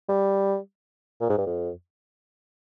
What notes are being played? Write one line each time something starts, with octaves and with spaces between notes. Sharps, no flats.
G3
A#2
G#2
G2
F2